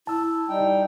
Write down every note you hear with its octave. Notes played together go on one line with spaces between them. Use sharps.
E4 A5 E6
G3 D#4 G5